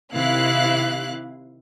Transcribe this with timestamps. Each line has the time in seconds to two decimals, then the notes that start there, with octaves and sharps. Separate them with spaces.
0.13 C3 D#3 E4 F5 F#6